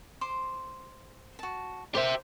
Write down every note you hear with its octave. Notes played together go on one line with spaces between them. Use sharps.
C5 C6 D6
F#4 A5
G4 A#4 C5 E5 F#5